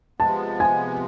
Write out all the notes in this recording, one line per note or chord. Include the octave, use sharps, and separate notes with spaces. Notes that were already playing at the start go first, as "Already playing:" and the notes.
C3 F3 G#3 B3 A5
G#5